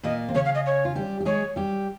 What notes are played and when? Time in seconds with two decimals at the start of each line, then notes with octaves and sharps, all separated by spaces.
0.03 A#2 A#3 D#5
0.29 C4
0.34 C#3 C#4 C#5
0.45 F5
0.54 D#5
0.65 C#5
0.85 F4
0.95 G3 G4
1.21 G4
1.25 G#3 G#4 C#5
1.56 G3 G4